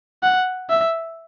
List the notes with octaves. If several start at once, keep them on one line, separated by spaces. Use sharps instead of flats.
F#5
E5